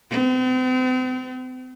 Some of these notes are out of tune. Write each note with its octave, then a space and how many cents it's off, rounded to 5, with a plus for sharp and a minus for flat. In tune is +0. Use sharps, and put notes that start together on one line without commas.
C4 -40